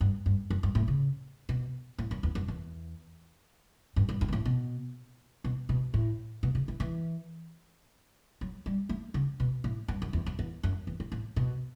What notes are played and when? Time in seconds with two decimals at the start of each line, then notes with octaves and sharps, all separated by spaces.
0.01 G2
0.26 G2
0.50 F#2
0.63 G2
0.75 A2
0.88 C#3
1.49 B2
1.98 A2
2.11 F#2
2.23 E2
2.35 F#2
2.48 E2
3.96 G2
4.09 G2
4.21 G2
4.28 B2
4.33 A2
4.45 B2
5.44 B2
5.69 B2
5.94 A2
6.43 B2
6.55 C#3
6.68 E3
6.80 E3
8.41 F#3
8.66 G3
8.89 A3
9.14 C#3
9.40 B2
9.64 A2
9.88 G2
10.02 F#2
10.13 E2
10.26 F#2
10.39 E2
10.63 F#2
10.87 E2
11.00 A2
11.12 A2
11.36 B2